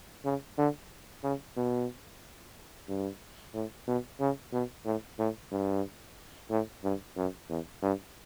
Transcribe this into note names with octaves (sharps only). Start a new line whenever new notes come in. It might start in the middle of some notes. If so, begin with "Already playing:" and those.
C#3
D3
C#3
B2
G2
A2
B2
C#3
B2
A2
A2
G2
A2
G2
F#2
E2
G2